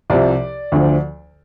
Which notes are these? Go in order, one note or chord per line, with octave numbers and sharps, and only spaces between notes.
C2 C3 F3 D5
D2 D3 F3